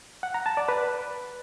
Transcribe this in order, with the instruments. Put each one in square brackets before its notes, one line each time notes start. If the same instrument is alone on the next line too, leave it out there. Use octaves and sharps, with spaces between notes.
[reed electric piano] F#5
A#5
A5
D5
B4